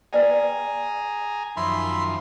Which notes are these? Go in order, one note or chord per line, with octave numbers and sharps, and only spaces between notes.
G#4 B4 D5 G5 G#5 A#5
F#2 D#3 F3 E5 B5 C6